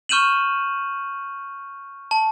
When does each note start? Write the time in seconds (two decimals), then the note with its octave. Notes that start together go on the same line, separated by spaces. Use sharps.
0.09 C#6 F6 G6 D#7 E7 F#7
2.11 A5